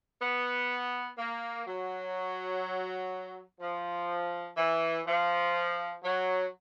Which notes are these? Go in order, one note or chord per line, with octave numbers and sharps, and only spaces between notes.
B3
A#3
F#3
F3
E3
F3
F#3